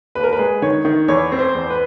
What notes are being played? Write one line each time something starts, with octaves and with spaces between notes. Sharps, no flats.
D#2 B4
A#4
B4
G#3
D#3 C#5
D#3
E2 C#5
C4
C5
E2
B4